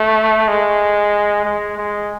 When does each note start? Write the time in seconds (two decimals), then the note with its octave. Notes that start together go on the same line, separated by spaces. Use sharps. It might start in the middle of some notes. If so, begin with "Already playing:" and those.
Already playing: A3
0.48 G#3
1.45 G#3
1.77 G#3